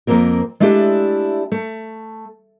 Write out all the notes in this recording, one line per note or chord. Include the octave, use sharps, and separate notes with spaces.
F2 B2 A#3 C4 A#4
G#3 A3 D4 E4 G4 D5
A3